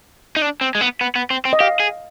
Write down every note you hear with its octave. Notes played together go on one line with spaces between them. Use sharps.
D#4
D4
C4
G#3
B3
B3
B3
C4
C4
D#5
G4 F5
G#4